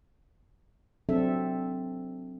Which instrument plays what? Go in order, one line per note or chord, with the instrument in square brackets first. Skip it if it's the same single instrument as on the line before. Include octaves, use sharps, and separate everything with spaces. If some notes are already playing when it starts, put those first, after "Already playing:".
[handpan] F#3 C4 D4 A4 E5